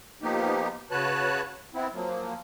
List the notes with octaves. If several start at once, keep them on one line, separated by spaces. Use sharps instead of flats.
F3 A#3 B3 D#4 G4
C#3 F#4 B4 C#5 A5 F#6
B3 C4 E4
F3 F#3 A#3